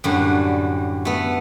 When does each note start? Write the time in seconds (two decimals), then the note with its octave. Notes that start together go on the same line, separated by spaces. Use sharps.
0.04 F#2 A2 D3 G3
1.05 A3 B3